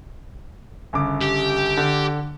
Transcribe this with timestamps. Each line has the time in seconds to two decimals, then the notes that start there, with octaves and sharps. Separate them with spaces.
0.93 G1 C#3 D6
1.21 G4
1.77 D3